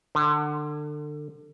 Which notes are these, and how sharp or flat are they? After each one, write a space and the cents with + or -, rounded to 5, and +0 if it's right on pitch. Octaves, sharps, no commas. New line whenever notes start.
D3 +25